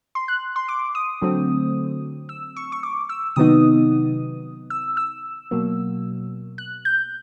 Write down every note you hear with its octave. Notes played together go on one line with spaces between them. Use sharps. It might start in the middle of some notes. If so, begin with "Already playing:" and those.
C6
F#6
C6
D6
D#6
D3 F#3 A3 C4
E6
C#6
C#6
D6
E6
C3 D#3 F#3 B3 D#4 D#6
E6
E6
B2 F#3 A#3
F#6
G6